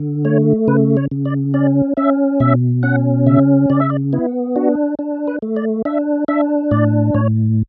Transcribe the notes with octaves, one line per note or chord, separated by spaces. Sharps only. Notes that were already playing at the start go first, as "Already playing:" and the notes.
Already playing: D3
A3 C#5
C#3 B4
C#5
C#3
D5
C#4 D5
C#4 E5
B2 E5
C#4 F#5
C#3 E5
C#3 D5
E5
D5
B3 E4
D4 F#4
D4
B4
A3
D5
D4 E5
D4 E5
A2 D5
A2 C#5